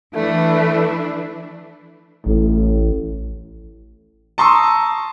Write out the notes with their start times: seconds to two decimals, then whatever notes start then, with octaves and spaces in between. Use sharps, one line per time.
0.14 E3 A3 D4 E4
2.26 A1 A2
4.38 A5 A#5 C6 C#6 D#6 E6